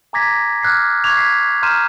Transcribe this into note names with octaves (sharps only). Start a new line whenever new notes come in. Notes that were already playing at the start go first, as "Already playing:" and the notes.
G#5 A#5 D6 G#6 A#6 B6
D6 F6 F#6 G#6 C7
C#6 D6 F#6 G#6 F7
G#6 B6 C7
A#5 C6 F6 G6 D#7 E7